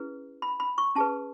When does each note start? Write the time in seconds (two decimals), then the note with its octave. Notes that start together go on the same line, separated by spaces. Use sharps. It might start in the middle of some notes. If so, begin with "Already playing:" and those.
Already playing: C#4 E4 G#4 B4
0.42 B5
0.60 B5
0.78 C#6
0.95 C#4 G#4 B4 A5